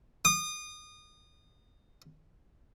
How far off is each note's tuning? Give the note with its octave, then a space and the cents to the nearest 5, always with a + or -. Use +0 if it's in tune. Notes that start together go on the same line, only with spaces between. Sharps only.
D#6 -30